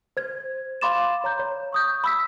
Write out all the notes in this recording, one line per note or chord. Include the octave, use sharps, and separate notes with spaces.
C5 G#6
F5 B5 C6 D6 A6 E7
C#5 A#5 G6
C#5
C#6 D#6 G6
B5 E6 B6